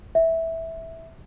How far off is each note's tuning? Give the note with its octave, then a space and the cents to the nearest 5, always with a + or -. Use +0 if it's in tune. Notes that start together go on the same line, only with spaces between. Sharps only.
E5 -10